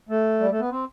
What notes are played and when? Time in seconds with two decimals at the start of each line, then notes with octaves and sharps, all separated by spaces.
0.09 A3
0.40 G3
0.50 A3
0.60 B3
0.71 C4